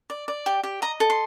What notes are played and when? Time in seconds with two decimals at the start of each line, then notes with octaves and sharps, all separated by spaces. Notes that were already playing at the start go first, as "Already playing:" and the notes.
0.10 D5
0.28 D5
0.46 G4
0.63 G4
0.82 D#5 A#5
1.00 A4
1.10 C6